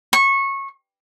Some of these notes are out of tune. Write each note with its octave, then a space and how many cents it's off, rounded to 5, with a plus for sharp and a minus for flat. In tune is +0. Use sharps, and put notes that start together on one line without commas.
C#6 -20